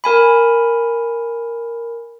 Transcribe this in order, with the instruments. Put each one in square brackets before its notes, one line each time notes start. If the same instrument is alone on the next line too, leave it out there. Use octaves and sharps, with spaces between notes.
[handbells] A#4 G#5 B5